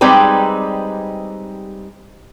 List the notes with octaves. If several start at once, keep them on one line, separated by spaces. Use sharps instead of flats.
G3 G#3 C4 D#4 G4 B4